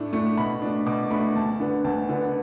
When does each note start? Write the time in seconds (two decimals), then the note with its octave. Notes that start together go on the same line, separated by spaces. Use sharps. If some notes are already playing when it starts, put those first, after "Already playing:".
Already playing: A2 A3 D4
0.13 A3 D4
0.37 B2 B5
0.62 A3 D4
0.86 B2 D6
1.10 A3 D4 B5
1.35 D2 A5
1.60 D3 B3 D4
1.84 D2 A5
2.09 D3 B3 D4